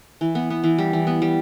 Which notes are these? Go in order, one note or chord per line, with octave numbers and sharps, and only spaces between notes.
E3
B3
B3
E3
G3
E3
B3
G3